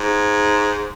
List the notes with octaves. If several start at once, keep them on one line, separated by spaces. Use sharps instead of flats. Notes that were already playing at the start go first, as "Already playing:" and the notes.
Already playing: G#2